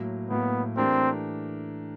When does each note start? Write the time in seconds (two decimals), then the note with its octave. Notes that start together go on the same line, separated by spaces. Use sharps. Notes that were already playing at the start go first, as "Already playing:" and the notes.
Already playing: A2 F#3 A#3
0.30 A2 F#3 A#3 B3
0.77 E3 A3 C4 D4 G4 A#4